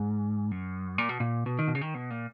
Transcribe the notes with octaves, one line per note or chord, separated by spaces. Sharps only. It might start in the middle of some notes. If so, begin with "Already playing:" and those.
Already playing: G#2
F#2
A#2
B2
A#2
B2
D#3
B2
C#3
D#3
B2
A#2